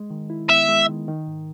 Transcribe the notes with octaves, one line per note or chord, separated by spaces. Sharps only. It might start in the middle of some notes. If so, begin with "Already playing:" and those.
Already playing: G#3
D#3
E4
B3 E5
G#3
D#3
D#3
G#2